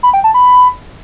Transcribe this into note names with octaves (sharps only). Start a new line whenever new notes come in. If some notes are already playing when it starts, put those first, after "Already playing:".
B5
G5
A5
B5